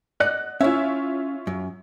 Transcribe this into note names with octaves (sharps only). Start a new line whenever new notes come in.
D5 D#5 F#5 F#6
C#4 E4 F4 C#5 E5
F#2